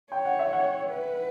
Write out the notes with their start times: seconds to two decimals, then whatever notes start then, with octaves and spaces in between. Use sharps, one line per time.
0.12 C#5 G5
0.25 F#5
0.39 E5
0.53 F#5
0.90 B4